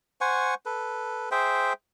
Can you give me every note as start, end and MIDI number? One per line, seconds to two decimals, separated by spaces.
0.21 0.54 72
0.21 0.54 78
0.21 0.54 80
0.21 0.54 85
0.66 1.29 69
0.66 1.29 71
1.31 1.73 68
1.31 1.73 72
1.31 1.73 76
1.31 1.73 79